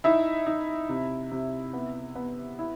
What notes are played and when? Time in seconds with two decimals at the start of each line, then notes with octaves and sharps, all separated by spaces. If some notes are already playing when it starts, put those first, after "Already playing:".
0.04 D#4 E4 E5
0.47 D#4
0.89 C3
1.31 C3
1.73 B3
2.16 B3
2.59 E4